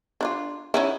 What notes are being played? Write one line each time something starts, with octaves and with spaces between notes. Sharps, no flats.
D4 E4 F4
C#4 D#4 E4